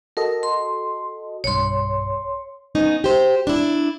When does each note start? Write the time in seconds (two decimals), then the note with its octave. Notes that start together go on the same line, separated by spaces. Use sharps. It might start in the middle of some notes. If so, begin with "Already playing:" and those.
0.17 F#4 A4 A#4 D#5
0.43 C6
1.44 B1 G2 C#5 C6
2.75 B3 C#4 D#4
3.04 G4 C5
3.47 D4 E4